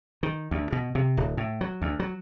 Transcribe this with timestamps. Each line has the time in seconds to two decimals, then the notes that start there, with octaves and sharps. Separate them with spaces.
0.23 D#3
0.51 D2
0.72 B2
0.95 C3
1.17 D1
1.37 A2
1.61 F#3
1.82 D2
2.00 F#3